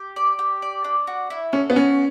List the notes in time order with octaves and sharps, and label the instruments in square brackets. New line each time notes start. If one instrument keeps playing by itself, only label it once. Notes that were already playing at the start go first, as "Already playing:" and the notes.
Already playing: [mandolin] G4
D5
G4
D5
D4
F#4
E4
[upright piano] C#4 [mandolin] A4
[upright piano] B3
[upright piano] C#4 [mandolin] F#4